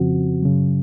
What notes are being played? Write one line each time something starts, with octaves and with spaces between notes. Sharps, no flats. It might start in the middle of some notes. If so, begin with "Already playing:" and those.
Already playing: F2 C#3 F3 C4 F#4
F#2 C#3 F#3